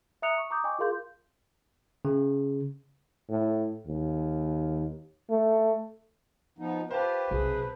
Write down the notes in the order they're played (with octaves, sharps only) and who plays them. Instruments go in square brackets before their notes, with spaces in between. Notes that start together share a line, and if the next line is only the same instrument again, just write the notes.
[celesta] E5 A#5 D#6 F#6 C#7 F7
C#6
A#5 D6 D#6 G6
D#5 G5 G#5 C#6 D6
F4 G#4 A#4 F5 C6 G6
[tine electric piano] C#3
[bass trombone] A2
D#2
A3
[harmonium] F3 B3 D#4
[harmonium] F4 G4 [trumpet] B4 [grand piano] C5 F5 A5
[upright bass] B1 [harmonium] C3 G#4